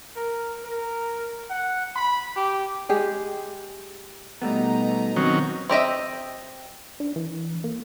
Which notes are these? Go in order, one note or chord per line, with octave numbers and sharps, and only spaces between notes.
A#4
A#4
F#5
B5
G4
G#3 G4 G#4
B2 G3 A3 B3 D#4 A#5
D#3 F#3 C4 C#4
C4 G4 D#5 E5
D4
E3
A#3